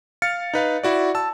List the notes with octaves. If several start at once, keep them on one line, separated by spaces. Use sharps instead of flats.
F5 F6 A6 C#7
D#4 B4 F5
E4 F#4 D5
A5 E6